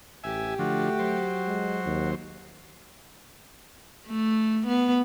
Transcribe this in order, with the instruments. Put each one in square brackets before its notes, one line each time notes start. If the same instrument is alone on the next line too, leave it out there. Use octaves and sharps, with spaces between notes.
[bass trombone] A1 [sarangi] G4 [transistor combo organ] E5 G#5
[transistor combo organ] D3 F3 [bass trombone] A3 [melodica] F#4
[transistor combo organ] F#3 C5
[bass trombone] G#3
D#2
[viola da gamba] A3
B3